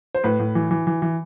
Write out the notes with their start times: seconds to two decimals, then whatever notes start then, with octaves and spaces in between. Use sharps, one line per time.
0.14 C5
0.24 A2 B4
0.40 A2
0.55 E3
0.71 E3
0.87 E3
1.02 E3